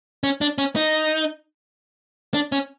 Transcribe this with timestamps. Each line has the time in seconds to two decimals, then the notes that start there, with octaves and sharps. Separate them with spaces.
0.24 C#4
0.41 D4
0.58 C#4
0.76 D#4
2.34 D4
2.52 C#4